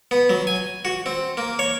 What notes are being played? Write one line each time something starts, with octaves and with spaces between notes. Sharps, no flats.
B3
F#3
G#5
F#4
C4
A#3
C#5